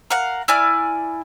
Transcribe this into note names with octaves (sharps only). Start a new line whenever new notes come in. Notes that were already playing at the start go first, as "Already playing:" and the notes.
A#4 F5 F#5
E4 D5 G#5 F6